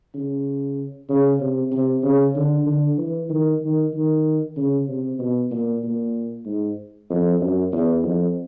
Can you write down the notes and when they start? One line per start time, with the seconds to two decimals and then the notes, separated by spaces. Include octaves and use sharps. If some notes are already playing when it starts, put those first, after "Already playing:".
0.14 C#3
1.10 C#3
1.40 C3
1.72 C3
2.03 C#3
2.36 D3
2.66 D3
2.98 E3
3.30 D#3
3.62 D#3
3.94 D#3
4.57 C#3
4.89 C3
5.19 B2
5.51 A#2
5.83 A#2
6.46 G#2
7.10 F2
7.41 F#2
7.73 E2
8.03 F2